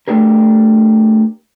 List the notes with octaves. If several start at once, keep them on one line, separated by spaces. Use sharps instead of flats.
A3 D4 G4 G#4 A#4